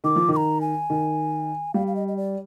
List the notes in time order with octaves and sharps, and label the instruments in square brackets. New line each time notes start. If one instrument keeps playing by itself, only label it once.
[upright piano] D#3 [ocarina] D6
[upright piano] F3
[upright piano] D#3 [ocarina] D6
[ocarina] A#5
G#5
[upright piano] D#3
[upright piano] G3 [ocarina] F5
[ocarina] F5
D#5
D#5
D5